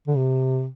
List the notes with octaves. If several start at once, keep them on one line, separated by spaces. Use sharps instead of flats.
D3
C3